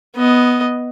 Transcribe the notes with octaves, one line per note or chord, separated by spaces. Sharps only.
B3 D#5